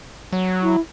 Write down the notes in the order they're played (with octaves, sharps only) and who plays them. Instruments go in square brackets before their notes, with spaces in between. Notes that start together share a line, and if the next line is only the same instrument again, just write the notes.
[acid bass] F#3
[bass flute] E4